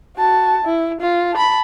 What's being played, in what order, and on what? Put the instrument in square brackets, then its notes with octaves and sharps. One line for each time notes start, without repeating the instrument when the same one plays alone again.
[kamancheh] F#4 A5
E4
F4
A5 B5